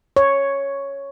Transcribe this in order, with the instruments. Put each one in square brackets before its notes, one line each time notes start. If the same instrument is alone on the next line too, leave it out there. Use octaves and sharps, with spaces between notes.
[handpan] C#5